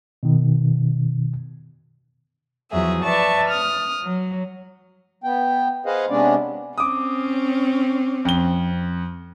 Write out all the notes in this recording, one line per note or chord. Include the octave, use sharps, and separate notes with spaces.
B2 D#3
E2 F3 F#3 G#4 E5
B4 D5 E5 A5 C#6
D#6 F6
F#3
B3 G5
G#4 B4 C5 D#5 F5 F#5
C3 G#3 B3 C#4 D4 D5
C4 C#4 D6 D#6
F2 G7